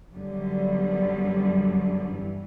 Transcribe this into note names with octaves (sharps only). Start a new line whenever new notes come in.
F#2 D3 G3 B3
G2 E3